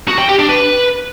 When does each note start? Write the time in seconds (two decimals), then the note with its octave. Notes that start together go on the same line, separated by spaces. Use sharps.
0.08 F#4
0.18 G5
0.29 G4
0.39 D4
0.49 B4